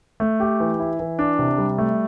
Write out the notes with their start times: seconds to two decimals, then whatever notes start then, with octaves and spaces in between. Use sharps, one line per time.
0.20 A3
0.40 G4
0.60 E3
0.80 E4
1.00 E3
1.19 D4
1.39 C3
1.58 G3
1.78 A3